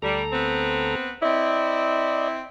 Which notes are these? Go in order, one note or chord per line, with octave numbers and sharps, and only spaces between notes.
D2 G3 A4 A#5
B3 C4
C4 E4 D5 D#5